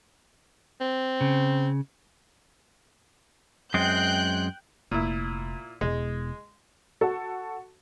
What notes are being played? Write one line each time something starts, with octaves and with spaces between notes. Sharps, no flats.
C4
C#3
F#2 G#3 C4 G5 F#6 G6
F1 A#2 E4
E1 G#3
F#4 A4